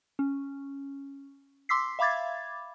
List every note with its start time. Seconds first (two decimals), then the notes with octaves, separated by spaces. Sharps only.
0.19 C#4
1.69 C6 D6 E6 B6 C7
1.99 E5 F5 B5 D6 G#6 A6